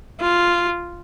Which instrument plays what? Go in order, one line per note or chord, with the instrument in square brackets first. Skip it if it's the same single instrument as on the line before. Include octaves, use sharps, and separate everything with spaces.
[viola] F4